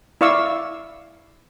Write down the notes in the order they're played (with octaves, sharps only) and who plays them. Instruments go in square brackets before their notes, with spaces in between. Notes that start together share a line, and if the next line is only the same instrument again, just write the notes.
[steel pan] E4 D5 F5 C#6 D6 E6